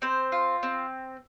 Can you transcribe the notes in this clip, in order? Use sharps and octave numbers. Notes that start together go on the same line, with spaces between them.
C4 C5
F4
C4